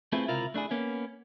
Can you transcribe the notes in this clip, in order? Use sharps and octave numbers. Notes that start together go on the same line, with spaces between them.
A3 C4 E4 F4 G#4 B4
C#2 C3 E4 F4 A#4 F5
A3 D4 E4 G#4
A#3 B3 C#4